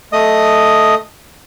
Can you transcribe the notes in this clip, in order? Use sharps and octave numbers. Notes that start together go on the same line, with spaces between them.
A3 D#5 D#6